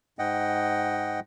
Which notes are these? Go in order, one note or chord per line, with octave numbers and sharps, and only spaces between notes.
G#2 D#5 F#5 G5